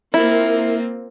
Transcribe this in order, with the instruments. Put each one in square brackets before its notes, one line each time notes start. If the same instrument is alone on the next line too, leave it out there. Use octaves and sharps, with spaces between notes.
[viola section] A#3 C4 F4 [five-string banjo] E4 [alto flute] A#4